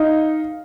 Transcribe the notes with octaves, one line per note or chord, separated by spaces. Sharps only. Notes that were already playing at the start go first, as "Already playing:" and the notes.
Already playing: D#4 F5